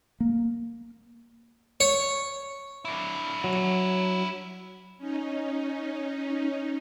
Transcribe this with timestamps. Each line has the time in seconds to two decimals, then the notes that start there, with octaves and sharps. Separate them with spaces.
0.20 A#3
1.80 C#5
2.85 D4 E4
3.44 F#3
4.98 C#4 D#4